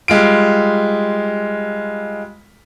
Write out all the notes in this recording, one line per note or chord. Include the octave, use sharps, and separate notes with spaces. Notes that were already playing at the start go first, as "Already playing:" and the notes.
G3 G#3 F4 D7